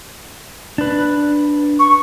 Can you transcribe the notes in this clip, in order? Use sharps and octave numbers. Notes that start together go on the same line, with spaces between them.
D4 B4
C#6